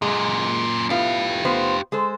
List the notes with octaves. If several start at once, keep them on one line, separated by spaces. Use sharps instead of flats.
F#2 A#2 G#3
A2 B3 F4 G4 F5
B3 F4 C5
G#3 A4 C5